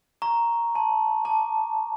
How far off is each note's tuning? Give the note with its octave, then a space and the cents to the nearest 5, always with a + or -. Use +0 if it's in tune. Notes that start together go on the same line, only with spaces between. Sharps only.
A#5 +0 C#6 +0
A5 -10 C6 +0
A5 +0 D6 +0